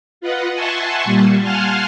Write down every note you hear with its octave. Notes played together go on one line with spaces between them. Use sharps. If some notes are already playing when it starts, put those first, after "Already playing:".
F4 B4 D#5 F#5
E5 F#5 G#5 A5 C6 C#6
A#2 G3
F5 F#5 G#5 A5 C6 F6